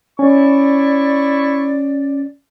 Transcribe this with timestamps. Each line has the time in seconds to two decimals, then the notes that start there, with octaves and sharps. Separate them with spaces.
0.19 C#4 E4 D5 C#6